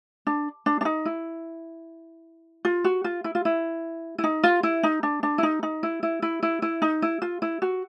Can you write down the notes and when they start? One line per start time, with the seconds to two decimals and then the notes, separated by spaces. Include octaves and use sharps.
0.27 D4
0.66 D4
0.81 D4
0.85 D#4
1.05 E4
2.65 F4
2.84 F#4
3.04 F4
3.24 E4
3.35 F4
3.45 E4
4.18 E4
4.24 D#4
4.43 F4
4.63 E4
4.83 D#4
5.03 D4
5.23 D4
5.38 E4
5.43 D#4
5.63 D#4
5.83 E4
6.03 E4
6.22 E4
6.43 E4
6.62 E4
6.82 D#4
7.02 E4
7.22 F4
7.42 E4
7.62 F#4